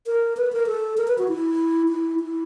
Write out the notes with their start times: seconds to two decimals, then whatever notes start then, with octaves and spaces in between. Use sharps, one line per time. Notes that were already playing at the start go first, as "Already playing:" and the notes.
0.07 A#4
0.37 B4
0.53 A#4
0.67 A4
0.97 A#4
1.08 B4
1.18 F#4
1.28 E4
1.88 E4
2.19 E4